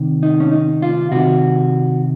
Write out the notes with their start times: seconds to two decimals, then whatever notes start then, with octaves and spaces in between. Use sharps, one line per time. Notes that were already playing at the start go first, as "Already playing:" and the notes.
Already playing: C3 D#3
0.23 D#4
0.40 C#4
0.51 D#4
0.82 F4
1.12 C3 D#3 F#4